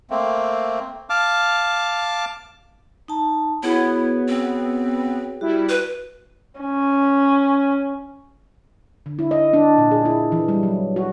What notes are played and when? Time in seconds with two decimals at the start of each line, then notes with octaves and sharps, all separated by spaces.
0.10 A3 A#3 C4
1.10 F5 A5 D6 F6
3.08 D#4 A5 A#5
3.63 B3 E4 F#4 G#4 C#5
4.28 C4
5.41 G3 E4 F#4
5.69 B4
6.60 C#4
9.06 D3
9.19 E4
9.31 D#5
9.53 D4
9.78 A#2
9.91 G#4
10.05 E4
10.32 E3
10.48 G3
10.63 F#3
10.96 F#4